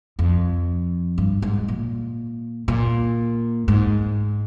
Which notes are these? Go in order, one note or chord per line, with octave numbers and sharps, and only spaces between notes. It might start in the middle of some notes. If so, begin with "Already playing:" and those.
F2
G2
G#2
A#2
A#2
G#2